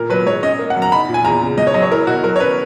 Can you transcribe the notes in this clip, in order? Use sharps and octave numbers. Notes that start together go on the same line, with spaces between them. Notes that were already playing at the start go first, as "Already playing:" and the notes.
Already playing: A#2 A#4
F#3 B4
G#2 C#5
C#4 D#5
A#3
F#5
F#2
A#5
D#4 B5
A#2
G#5
E2 A#5
C#3
G#2 D#5
C#5
F#3 D#5
C#5
E4 A#4
B2 F#4
F#3 A#4
C#5
C#4 B4